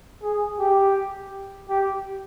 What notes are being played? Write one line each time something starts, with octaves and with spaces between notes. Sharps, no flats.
G#4
G4
G4